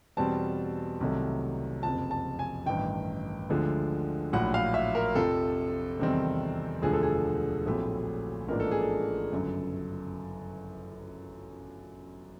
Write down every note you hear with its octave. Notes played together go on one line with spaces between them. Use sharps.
E2 B2 G3 C4 A5
C2 C3 D#3 F#3 A3
F#1 F2 C3 F3 A5
A5
G#5
A1 G2 D#3 G5
D2 D3 F3 G#3
A#1 A2 F#3 F#5
F5
E5
A#4
F2 C3 F3 A4
E2 C3 D#3 G3 C4
E1 D2 D3 F3 G#4
A4
G#4
A#1 A2 F#3 A3 C4
A1 G#2 F3 A#3 D4 A#4
A4
G#4
A4
G1 F#2 C#3